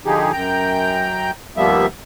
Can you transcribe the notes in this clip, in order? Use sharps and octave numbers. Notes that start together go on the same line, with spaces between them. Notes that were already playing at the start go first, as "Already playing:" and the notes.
D3 F3 D#4 G4 G#4
F#2 G5 A#5 G6
D#2 F3 G3 A#3 B3 E5